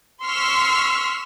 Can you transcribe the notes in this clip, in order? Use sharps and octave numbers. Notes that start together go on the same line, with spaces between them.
C6 C#6 E6 F6 B6 C7